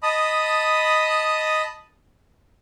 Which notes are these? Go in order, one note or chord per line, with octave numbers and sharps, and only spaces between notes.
D#5 A5 B5 D#6